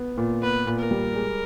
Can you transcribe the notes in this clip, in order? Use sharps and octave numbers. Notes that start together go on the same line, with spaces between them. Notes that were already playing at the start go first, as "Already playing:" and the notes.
Already playing: B3
A#2
B3 B4
A#2
A#4
G3
G#3